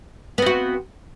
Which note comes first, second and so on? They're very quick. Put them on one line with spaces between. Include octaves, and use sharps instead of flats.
B3 C4 F#4